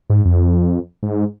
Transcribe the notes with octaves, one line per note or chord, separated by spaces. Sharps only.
G#2
F2
G#2